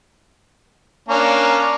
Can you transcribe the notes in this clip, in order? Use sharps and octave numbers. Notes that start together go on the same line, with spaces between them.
A#3 C#4 D4